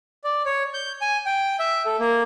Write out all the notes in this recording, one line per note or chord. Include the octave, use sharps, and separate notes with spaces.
D5
C#5
G6
G#5
G5
E5
A4
A#3